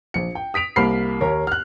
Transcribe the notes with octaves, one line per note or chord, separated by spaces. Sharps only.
A#1 C#7
G5
D#6 B6 D7 F7
C2 A#3 B5 F6 C7
D#2 A#4 C#5
F6 F#6